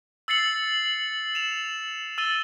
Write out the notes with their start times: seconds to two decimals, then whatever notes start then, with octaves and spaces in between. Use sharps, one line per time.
0.28 E6 A6 C7 C#7 F#7
1.35 E7 F7
2.18 E6 A6 D#7 G7